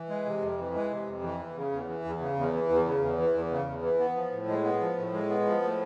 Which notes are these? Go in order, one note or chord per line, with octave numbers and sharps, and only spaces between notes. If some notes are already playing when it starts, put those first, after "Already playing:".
Already playing: E3
G#3
C3
F2
E3
G#3
C3
F2
E3
E2
C#3
E2
E3
E2
C#3
E2
E3
E2
C#3
E2
E3
E2
C#3
E2
E3
B3
F3
A2
G#3
B3
F3
A2
G#3
B3
F3
A2